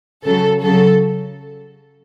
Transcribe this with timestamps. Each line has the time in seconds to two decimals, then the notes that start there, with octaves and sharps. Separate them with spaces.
0.25 C#3 F#3 A4
0.62 C#3 F#3 A4